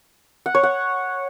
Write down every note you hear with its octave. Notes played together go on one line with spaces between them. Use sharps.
F#5
C#5
F#5